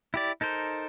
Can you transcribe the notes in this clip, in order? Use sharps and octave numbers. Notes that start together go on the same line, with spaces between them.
E4 G4 D5
D#4 A4 A#4 C5